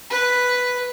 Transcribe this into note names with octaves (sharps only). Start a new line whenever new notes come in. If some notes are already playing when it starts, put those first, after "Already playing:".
B4